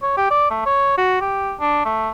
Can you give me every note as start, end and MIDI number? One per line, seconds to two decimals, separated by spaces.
0.03 0.15 73
0.17 0.29 67
0.31 0.50 74
0.50 0.62 57
0.66 0.95 73
0.98 1.19 66
1.21 1.54 67
1.60 1.84 62
1.85 2.09 57